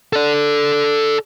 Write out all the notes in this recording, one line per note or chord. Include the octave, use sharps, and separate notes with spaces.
A4 D5